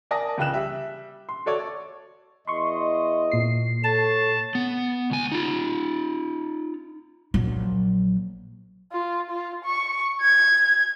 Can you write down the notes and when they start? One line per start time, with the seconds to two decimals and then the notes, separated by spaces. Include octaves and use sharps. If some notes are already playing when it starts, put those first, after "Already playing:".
0.11 A#4 D5 G#5 A5 D#6 A#6
0.38 C#2 C#3 G5 F#6 E7
0.54 G3 E5
1.29 C6
1.46 F#4 A4 C#5 D5 C#6
2.47 E2 E4 D#5 C6 C#6
3.32 A#2 C7
3.83 A4 C#5 A5
4.55 B3
5.10 C#2 G#5
5.32 D#4 F4
7.34 A#1 F#3
8.92 F4
9.30 F4
9.64 C#6
10.21 G#6